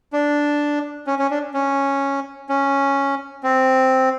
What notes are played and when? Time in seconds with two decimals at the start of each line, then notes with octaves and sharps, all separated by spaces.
0.13 D4
1.07 C#4
1.19 C#4
1.31 D4
1.54 C#4
2.49 C#4
3.43 C4